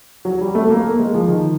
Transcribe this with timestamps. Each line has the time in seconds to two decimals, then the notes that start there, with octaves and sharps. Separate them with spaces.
0.25 F#3
0.41 G3
0.55 A3
0.70 A#3
0.84 A#3
0.99 G#3
1.14 F3
1.28 D#3